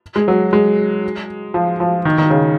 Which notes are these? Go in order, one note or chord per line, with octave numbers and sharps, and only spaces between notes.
G#3
F#3
G#3
F3
F3
D#3
D#3
C#3